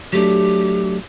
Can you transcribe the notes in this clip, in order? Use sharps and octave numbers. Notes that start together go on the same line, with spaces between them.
F#3 A3 D4 G4